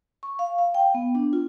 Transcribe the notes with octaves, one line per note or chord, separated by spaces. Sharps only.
C#6
F5
F5
G5
B3
D4
F4